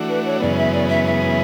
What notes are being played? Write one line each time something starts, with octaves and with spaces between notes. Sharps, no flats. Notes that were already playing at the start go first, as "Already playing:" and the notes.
Already playing: E3 A3 D4 F#4
B4
C#5
F#2 C#3 E3 G#3 B3 D5
E5
D5
E5
E5